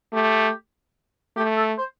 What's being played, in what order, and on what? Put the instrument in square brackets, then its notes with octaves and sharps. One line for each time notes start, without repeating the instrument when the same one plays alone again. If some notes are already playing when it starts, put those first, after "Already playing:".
[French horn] A3 [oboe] G4
[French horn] A3 [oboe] G4
[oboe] A4
C5